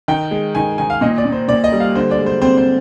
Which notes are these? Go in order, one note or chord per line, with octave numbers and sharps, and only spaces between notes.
D#3 G5
G#3
D#3 G#5
D#3 G#5
F5
A#2 D#5
D5
A#2
C5
A#2 D5
D#5
G3
F5
D3 C5
D5
G#3
C5
C4 C5
C5